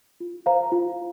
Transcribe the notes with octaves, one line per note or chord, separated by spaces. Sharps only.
F4
C5 F5 A#5
F4